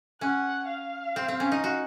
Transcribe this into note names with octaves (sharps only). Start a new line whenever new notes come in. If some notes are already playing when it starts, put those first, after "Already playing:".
C#4 F#5
F5
C4
C4
C#4
D#4
F#4